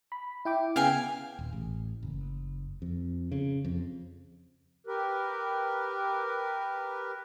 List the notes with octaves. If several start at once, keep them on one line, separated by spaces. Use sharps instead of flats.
B5
E4 G5 D6
C#3 B3 F5 G5 G#5
D#1
A1
F#1
F2
C#3
F2
G4 A#4 B4